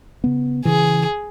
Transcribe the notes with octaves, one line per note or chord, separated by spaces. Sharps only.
C#3 B3
C#3 E3 G#4